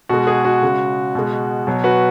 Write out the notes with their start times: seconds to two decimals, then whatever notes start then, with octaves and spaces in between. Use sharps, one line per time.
0.09 B2 G#3 F#4
0.27 G#4
0.45 F#4
0.62 C#3 G#3
1.15 B2 G#3
1.67 B2 F#3
1.84 F#4 B4